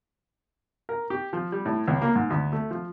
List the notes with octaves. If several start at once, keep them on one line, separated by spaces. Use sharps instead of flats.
A#4
G4
F3
G3
A2
C#2
A#3
G#2
D2
A3
F3